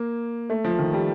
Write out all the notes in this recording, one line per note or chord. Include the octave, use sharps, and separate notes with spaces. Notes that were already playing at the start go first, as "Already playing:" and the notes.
Already playing: A#3
A3
F3
D#3
G3